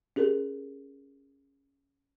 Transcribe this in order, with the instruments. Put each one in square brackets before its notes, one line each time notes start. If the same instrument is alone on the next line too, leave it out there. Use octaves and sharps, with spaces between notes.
[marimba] C#4 G4 G#4 A#4